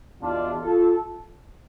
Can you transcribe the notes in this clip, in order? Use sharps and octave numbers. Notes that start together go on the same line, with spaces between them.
E2 B2 D4 F4
F4 A4